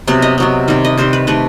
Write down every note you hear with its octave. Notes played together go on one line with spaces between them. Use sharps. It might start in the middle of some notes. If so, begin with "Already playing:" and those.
C3 F#3 B3
D#5
C3 F#3 B3
C3 D#3 G3
D#5
C3 D#3 G3 C5
B4
C3 D#3 A3 B4